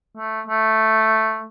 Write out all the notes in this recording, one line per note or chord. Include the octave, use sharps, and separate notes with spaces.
A3
A3